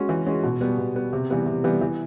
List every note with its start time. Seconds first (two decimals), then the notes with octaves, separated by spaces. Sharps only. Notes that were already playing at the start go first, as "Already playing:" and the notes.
Already playing: G#3 C#4 F#4
0.09 E3
0.26 G#3 C#4 F#4
0.43 B2
0.61 G3 B3
0.78 B2
0.95 G3 B3
1.13 C3
1.30 E3 G3 B3
1.46 C3
1.64 E3 G3 B3
1.81 E3